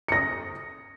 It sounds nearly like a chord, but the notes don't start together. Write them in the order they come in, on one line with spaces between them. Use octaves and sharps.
C#7 A#6 D#6